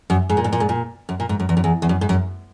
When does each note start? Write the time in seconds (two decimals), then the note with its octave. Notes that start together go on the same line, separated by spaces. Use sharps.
0.10 F#2
0.30 G#2
0.37 A#2
0.44 G#2
0.53 A#2
0.60 G#2
0.69 A#2
1.09 F#2
1.20 A#2
1.29 G#2
1.40 F#2
1.49 E2
1.57 F#2
1.64 E2
1.82 E2
1.89 F#2
2.01 G#2
2.09 F#2